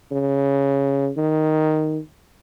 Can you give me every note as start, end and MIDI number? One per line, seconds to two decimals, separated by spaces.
0.11 1.10 49
1.17 1.98 51